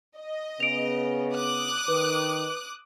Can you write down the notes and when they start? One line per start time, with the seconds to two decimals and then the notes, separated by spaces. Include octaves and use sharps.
0.17 D#5
0.60 C#3 B3 D7 F7
1.33 D6 D#6 F#6
1.88 D#3 B4